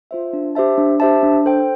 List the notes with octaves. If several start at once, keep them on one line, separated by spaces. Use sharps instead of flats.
F4 C5 E5
D4
G4 C5 E5 A5
D4
G4 C5 E5 A5
D4
A4 C5 G5